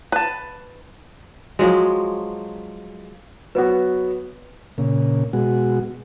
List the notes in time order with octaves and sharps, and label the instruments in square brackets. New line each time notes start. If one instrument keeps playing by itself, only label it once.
[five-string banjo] B4 A5
[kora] F3 F#3 G#3
[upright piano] F#3 B3 F#4 [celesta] B4
[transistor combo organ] A#2 C#3
B2 G#3 F#4